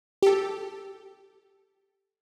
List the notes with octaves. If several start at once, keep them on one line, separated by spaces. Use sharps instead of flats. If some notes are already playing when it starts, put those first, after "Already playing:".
G4 A4